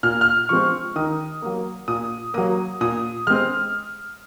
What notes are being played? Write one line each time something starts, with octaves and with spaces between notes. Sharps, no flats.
A#2 F6
F6
F3 G#3 C4 C#6
D#3 D#6
F#3 A#3
A#2 D#6
F#3 A#3 D#6
A#2 D#6
G#3 C4 F6